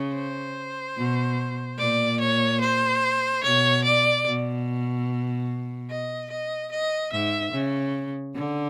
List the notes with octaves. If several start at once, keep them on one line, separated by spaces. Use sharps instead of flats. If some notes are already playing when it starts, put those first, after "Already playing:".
Already playing: C#3
C5
B2
A#2 D5
C#5
C5
B2 C#5
D5
B2
D#5
D#5
D#5
G#2 E5
C#3
D3